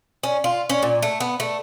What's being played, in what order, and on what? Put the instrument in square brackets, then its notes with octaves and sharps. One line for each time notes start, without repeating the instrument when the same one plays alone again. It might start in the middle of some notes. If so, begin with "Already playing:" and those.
[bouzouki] C#4
F4
C#4
A#2
A3
B3
A3